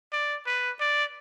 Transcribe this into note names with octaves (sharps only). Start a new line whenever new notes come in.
D5
B4
D5